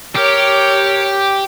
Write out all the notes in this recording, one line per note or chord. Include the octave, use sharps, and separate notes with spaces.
G4 A#4 C#5